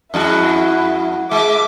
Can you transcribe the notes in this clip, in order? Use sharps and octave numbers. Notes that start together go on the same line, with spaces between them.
F2 G#3 E4 F#4
G#3 E5 D6